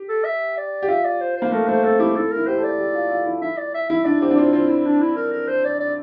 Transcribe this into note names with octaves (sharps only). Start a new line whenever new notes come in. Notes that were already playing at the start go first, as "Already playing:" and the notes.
Already playing: G4
A4
E5
D5
G4
F4 E5
D5
C5
C5
A#3
A3 A#4
A3 C5
C4 A4
E4 G4
E4 A4
E4 A#4
G4 C5
A4
D5
G4
F4
F4
E4
E4 E5
D5
E5
E4 E5
D4 D5
C4 G4
D4
C4 F4
C4 F4
E4
D4
E4
A#4
A#4
C5
D5
D5